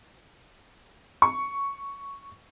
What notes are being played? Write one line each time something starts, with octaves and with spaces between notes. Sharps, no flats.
C#6